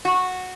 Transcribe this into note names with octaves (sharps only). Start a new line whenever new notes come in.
F#4